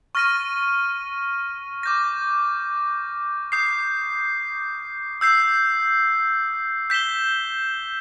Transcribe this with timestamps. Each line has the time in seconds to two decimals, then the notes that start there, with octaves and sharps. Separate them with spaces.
0.15 C#6 F6 A#6 D#7
1.83 D6 G6 A#6
3.52 D#6 G6 C7
5.21 E6 G6 C7
6.90 G6 B6 E7 G7